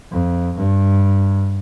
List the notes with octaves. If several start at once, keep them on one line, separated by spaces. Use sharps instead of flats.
F2
G2